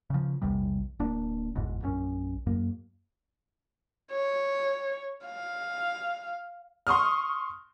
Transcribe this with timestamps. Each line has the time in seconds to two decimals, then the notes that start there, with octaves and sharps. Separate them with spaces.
0.10 C#3 F3
0.42 A#1 E2 C3 G3
0.99 D1 A#3 D4
1.55 G1 E2 G#2 B2
1.82 A#1 F#2 C#4
2.47 F#2 A#3
4.11 C#5
5.26 F5
6.87 C6 C#6 D#6 F6